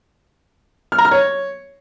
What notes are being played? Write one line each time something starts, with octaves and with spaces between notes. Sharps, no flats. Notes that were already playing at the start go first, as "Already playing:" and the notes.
F6
A#5
F6
C#5